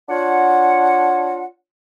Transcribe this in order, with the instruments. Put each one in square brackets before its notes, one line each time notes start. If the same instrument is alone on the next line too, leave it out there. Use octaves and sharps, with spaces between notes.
[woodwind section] D4 F4 C#5 F#5